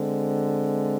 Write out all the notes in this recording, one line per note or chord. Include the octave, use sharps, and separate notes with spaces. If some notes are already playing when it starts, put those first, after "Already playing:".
Already playing: D3 G#3 C4